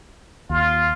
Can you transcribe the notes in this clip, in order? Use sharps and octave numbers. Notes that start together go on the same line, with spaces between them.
D#2 F4